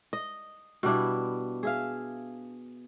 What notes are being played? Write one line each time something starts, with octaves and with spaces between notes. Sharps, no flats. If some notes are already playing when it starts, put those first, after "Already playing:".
D#5
B2 G3 D4 E4
G#4 E5 F5